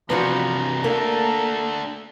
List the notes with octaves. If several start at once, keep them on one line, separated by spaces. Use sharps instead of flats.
C3 E3 F3 B3 D4 F#4 A#5
A3 A#3 D4 A4